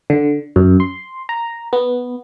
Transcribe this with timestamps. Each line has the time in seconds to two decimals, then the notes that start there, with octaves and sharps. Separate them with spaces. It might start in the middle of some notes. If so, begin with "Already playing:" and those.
0.10 D3
0.56 F#2
0.80 C6
1.29 A#5
1.73 B3